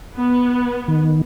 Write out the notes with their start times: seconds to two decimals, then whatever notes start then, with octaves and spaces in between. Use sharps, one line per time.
0.16 B3
0.88 D#3